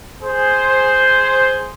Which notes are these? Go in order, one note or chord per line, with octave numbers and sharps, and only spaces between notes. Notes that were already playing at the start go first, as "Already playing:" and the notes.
G#4 C5